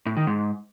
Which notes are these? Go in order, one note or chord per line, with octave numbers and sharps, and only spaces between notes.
A2
D#3
G#2